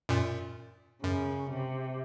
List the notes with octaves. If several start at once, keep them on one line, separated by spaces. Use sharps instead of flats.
F#2 A#2
F#2 C#3
C3